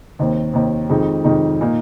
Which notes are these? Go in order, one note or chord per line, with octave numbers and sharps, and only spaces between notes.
D#2 D#3 C4
D#2 D#3 C4
F2 D#3 G#3 D#4
F2 D#3 G#3 D#4
A#2 A#3 D#4